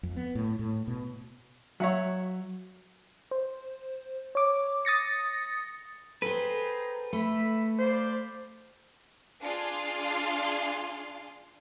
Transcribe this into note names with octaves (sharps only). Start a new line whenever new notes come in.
F2
B3
A2
A2
B2
F#3 F#4 C#5 E5 F#5
C5
C#5 D6
D#6 A6 A#6 C#7
G#4 A4 B4 C5 G5 A#5
A3 E5 B5
C5 D5 F5 B5
D4 F4 G#4 F5 C6